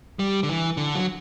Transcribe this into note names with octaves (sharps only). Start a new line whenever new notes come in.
G3
D3
E3
D3
F#3